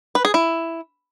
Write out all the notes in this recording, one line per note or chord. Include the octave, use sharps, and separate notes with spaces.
B4
G#4
E4